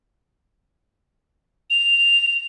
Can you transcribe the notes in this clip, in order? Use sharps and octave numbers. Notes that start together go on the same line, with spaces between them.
F7